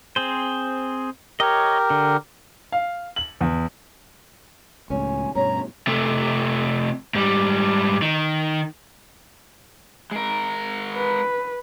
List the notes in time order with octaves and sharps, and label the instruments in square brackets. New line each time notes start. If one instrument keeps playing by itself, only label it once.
[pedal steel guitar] C4 G#4 C5
[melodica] G4 A#4 [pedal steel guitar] C#5 D#5
[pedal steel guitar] D3
[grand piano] F5
F#7
E2
[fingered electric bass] C#2 A2 [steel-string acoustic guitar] C#4 [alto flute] G#5
[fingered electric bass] G2 B2 [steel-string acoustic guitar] C#4 [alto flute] C#5 [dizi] A#5
[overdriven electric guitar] C3 A3
G#2 G3
D#3
[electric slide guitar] G#3 A#4
[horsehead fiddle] B4